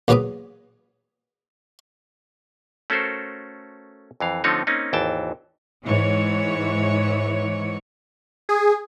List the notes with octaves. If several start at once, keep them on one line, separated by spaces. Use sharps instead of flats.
E2 A#2 F#3 B3 D6 D#6
A3 C#4 F#4 A4 A#4 C5
F2 E3 F5
D3 F3 A3 C4 D#4 C#5
A#3 C4 C#4 D#4
G#1 D#2 E3 G5 A5
G#2 E3 C#5
G#4